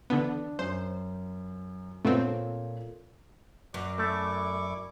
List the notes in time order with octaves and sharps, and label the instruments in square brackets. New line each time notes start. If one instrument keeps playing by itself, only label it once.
[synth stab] D3 E3 B3 [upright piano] D4
[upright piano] F#2 [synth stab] C5
[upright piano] A#2 A4 C#5 [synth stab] A3 B3 C4
[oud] F#2 [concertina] F#4 D6 [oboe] D5
[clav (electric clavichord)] A3 [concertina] E4 C#6 D6